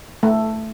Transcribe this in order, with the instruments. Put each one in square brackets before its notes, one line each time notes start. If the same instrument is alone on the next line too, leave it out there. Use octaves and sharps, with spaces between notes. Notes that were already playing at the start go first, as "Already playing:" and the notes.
[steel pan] A3